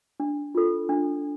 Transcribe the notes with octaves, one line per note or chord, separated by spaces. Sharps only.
D4
F4 A4
D4